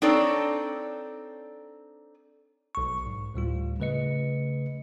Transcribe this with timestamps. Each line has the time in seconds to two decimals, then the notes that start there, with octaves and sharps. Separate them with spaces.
0.02 C4 D4 D#4 A4 C#5 D5
2.75 B1 C#6
3.06 G#2
3.34 D2 A2 G3 F4
3.80 C#3 A3 B4 D#5 C#7